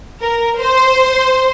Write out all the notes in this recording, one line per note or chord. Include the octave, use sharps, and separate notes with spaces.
A#4
C5 C6